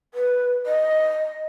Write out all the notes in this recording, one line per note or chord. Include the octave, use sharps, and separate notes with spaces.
B4
D#5